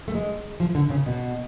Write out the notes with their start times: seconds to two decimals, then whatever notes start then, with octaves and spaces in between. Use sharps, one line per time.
0.08 A3
0.15 G#3
0.60 F3
0.75 D3
0.90 C#3
1.06 B2